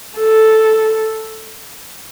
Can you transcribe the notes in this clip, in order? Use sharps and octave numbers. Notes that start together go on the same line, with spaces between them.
A4